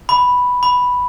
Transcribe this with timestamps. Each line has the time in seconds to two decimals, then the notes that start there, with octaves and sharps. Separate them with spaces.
0.09 B5
0.63 B5